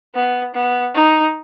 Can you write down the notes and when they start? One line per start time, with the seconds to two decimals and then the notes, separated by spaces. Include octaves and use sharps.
0.14 B3
0.54 B3
0.94 D#4